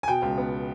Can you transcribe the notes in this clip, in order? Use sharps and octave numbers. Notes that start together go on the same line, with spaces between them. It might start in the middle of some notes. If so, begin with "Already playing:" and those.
G#5
B2 G5
C#2
B3